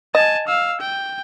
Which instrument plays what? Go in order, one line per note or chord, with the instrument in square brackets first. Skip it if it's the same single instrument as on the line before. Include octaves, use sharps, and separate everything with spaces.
[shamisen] D#5 [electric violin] G#5 A5
[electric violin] F5 E6
G5